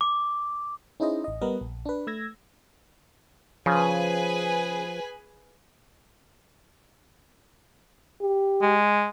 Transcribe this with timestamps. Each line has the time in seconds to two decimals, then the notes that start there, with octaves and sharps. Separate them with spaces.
0.01 D6
1.00 C#4 D#4 E4 G#4 C5 D#5
1.24 A1 D#5
1.41 G3 B3 A#4 B4 D#5
1.61 A#1
1.86 D4 B4
2.07 A3 E6 G#6 A#6
3.66 C#3 F3 G#4 B4 G#5
8.21 G4
8.62 G#3